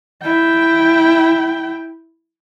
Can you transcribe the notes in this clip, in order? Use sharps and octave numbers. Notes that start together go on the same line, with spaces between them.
E4 G5